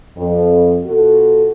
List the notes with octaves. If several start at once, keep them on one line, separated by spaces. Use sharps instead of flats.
F2
B2 F4 F#4 A4